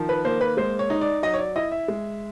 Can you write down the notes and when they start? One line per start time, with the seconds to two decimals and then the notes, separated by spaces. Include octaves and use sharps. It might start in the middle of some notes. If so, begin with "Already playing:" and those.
Already playing: D#3 F3
0.09 B4
0.25 A#3 C5
0.41 B4
0.57 G#3 C5
0.79 C#5
0.90 D#4
1.01 D5
1.23 F#3 D#5
1.34 C#5
1.39 D5
1.56 E4 D#5
1.72 E5
1.88 G#3